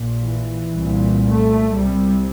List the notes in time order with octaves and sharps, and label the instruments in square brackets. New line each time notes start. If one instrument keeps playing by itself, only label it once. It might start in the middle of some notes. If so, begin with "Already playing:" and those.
Already playing: [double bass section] A#1 A#2
E3
C2 A#2
A3
C2 C3 G3